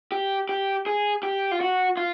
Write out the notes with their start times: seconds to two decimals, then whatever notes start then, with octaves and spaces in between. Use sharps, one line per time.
0.12 G4
0.49 G4
0.86 G#4
1.23 G4
1.51 F4
1.61 F#4
1.97 F4